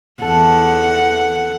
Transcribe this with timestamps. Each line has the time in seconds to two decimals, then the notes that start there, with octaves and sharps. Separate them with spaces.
0.22 E2 A4 F#5